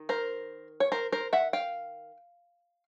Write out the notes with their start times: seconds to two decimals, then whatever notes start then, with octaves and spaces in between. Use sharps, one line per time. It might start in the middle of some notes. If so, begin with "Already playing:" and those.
Already playing: D#3
0.09 A#4 C5
0.80 C#5
0.92 A#4 C5
1.12 A#4 C5
1.33 E5 F#5
1.53 F5 G5